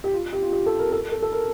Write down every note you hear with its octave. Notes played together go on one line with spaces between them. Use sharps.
G4
F4
G4
F4
G4
A4
A#4
A4
A4
A4
A#4